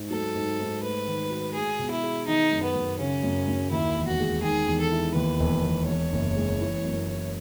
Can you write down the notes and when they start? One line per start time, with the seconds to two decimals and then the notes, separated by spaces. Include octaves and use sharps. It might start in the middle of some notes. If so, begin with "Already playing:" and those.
Already playing: G#2
0.10 F#3 A4
0.35 G#2
0.59 G#2
0.82 A3 B4
1.07 D#3
1.30 F#4
1.54 G#3 G#4
1.79 B2
1.91 E4
2.03 G#4
2.27 D#3 D#4
2.51 F#2
2.63 B3
2.75 F#2
2.99 C#3 C#4
3.23 F#2
3.48 F#2
3.71 D#2 E4
3.96 E1
4.08 F#4
4.20 G#3
4.43 D#3 G#4
4.67 E2
4.80 A4
4.92 E4
5.15 D#2 B4
5.40 E1
5.63 E1
5.87 E2 C#5
6.12 F#1
6.36 G#3
6.61 E3
6.85 F#2
7.08 E4